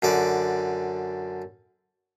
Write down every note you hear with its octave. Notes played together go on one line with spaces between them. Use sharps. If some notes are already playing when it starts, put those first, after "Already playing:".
F#2 D3 D5